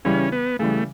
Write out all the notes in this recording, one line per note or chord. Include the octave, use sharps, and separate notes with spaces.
C#3 E3 G3 C#4
B3
C#3 E3 G3 A3